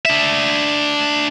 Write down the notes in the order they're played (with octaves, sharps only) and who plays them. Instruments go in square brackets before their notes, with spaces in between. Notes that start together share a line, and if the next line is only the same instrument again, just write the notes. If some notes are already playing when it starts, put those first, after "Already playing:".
[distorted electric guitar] D4 E5